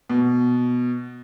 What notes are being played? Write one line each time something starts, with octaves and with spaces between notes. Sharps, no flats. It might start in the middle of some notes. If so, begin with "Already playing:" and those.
B2